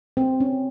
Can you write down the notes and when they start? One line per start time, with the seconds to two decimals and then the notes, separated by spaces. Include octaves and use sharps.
0.17 C4
0.40 C#4